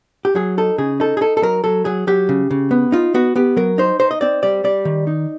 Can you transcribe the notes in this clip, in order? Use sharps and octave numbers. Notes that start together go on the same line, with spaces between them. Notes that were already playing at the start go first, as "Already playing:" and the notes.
G4
F#3 G#4
D#4 A4
C#3 G#4
D#4 A4
G#4
D#4 A4
A4
F#3 A#4
F#3 A4
F#3 G#4
F#3 G4
C#3
C#3
B3
D#4 F4
B3 F#4
B3 G4
F#3 A#4
D#4 C5
D#4 C5
D#5
C4 D5
G3 D5
G3 D5
D#3
D#4